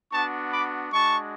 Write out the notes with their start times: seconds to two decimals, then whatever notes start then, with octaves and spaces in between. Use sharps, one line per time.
0.11 B3 D4 F#4 A5 C#6
0.52 B5 D6
0.92 G#3 D4 F#4 A5 C#6